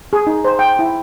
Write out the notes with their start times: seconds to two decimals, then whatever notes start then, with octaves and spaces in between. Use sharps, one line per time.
0.13 G#4
0.27 D#4
0.45 C5
0.59 G5
0.79 E4